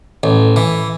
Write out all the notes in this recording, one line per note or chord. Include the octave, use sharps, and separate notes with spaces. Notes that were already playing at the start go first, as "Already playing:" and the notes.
A1
E3